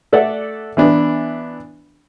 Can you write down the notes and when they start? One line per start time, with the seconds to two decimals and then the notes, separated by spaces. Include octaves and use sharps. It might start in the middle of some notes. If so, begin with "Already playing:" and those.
0.13 A3 A4 D5 E5 F#5
0.77 E3 B3 D4